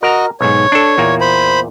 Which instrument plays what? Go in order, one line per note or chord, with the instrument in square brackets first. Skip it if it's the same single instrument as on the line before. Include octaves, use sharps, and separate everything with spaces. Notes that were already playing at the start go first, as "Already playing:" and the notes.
[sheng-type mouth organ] F#4 D#5 [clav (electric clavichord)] A#4 A#5
[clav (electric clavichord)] B1 G#2 [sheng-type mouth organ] C#5
[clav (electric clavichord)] D4 A4
E2 A#2 A#3
[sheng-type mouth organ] C5 B5